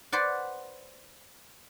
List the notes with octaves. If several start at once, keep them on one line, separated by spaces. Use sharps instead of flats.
B4 C5 D5 F#5